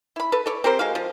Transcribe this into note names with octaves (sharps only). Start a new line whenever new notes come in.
E4 B5
A4 B4
A4 C#5 D5
C4 G4 A#4 C5
G#3 F#4 F5
F3